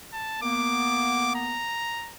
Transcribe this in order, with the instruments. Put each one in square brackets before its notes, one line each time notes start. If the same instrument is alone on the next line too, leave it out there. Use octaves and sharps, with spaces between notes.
[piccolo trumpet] A5
[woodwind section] A#3 B3 [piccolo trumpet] D6
[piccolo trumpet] A#5